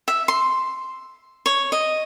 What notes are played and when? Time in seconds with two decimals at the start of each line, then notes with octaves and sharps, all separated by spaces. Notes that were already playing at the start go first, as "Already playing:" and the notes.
0.08 E5
0.28 C6
1.46 C#5
1.72 D#5